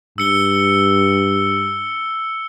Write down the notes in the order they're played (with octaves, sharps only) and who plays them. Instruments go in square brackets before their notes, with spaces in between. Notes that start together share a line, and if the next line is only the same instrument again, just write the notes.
[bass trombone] G2 [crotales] E6 C#7 G7